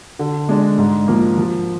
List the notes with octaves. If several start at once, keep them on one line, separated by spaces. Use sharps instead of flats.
D3
G#3 D4
G#2
F3 A#3
F3